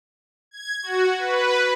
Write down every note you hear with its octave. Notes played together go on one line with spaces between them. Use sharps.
G#6
F#4
B4